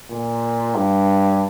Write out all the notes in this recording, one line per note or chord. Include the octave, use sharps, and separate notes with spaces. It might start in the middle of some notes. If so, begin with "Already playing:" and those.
A#2
G2